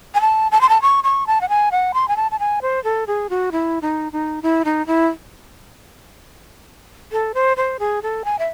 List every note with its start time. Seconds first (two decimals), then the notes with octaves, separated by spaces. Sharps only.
0.15 G#5
0.21 A5
0.52 A5
0.61 C6
0.69 A5
0.82 C#6
1.04 C#6
1.27 A5
1.41 F#5
1.49 G#5
1.72 F#5
1.94 C6
2.08 G#5
2.16 A5
2.31 A5
2.39 G#5
2.62 C5
2.84 A4
3.07 G#4
3.30 F#4
3.52 E4
3.82 D#4
4.12 D#4
4.42 E4
4.65 D#4
4.87 E4
7.12 A4
7.34 C5
7.57 C5
7.79 G#4
8.02 A4
8.25 G#5
8.39 E5